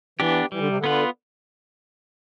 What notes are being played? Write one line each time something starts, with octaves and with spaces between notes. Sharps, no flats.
E3 B3 D4 G4
E3 G3
D3
C3
D3
B3 F4 B4